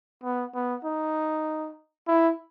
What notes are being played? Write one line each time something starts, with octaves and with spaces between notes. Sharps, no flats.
B3
B3
D#4
E4